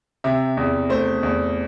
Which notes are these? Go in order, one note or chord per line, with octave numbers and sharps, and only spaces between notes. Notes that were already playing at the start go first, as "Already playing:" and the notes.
C3 E5
E2
A3 C5
E2